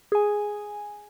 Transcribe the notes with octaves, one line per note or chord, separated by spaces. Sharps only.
G#4 G#5